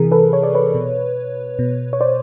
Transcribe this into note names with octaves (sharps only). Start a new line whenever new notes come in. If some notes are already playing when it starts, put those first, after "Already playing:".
Already playing: C3 E3 G#4 A#4
A4 B4
C#5
D5
B4 C#5
B2
B2
C#5
C5 D5